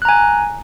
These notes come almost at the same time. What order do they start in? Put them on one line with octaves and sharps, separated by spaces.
F#6 A#5 G#5